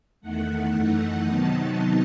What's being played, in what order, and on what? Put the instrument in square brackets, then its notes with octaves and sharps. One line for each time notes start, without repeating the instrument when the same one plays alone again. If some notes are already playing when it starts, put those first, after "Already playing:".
[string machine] E2 D#3 A3 F#5
F#2 E3 A3 D#4
C3 D#3 F#3 B3 D#4 A5